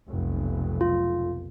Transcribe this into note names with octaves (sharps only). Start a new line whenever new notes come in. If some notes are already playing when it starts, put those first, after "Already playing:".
F1 B1
F4